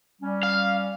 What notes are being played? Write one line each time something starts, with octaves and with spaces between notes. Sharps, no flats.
G3 C#4
F5